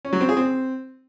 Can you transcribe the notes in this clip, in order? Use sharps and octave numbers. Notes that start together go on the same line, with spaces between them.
C#4
F#3
C4
G#4
C4